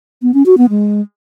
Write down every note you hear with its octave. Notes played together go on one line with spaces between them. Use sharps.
B3
C#4
F#4
B3
G#3